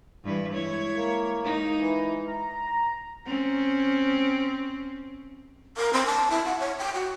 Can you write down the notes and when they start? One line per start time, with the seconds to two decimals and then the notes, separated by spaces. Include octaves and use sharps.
0.24 G2 E3 B4
0.53 G#3 E4 C#5
0.97 A#3
1.41 G#3 D#4
1.80 E3
2.27 A#5
3.26 C4 C#4
5.77 A#4
5.93 C4
6.06 A5
6.30 E4
6.45 F#5
6.60 C#5
6.79 G5
6.94 F#4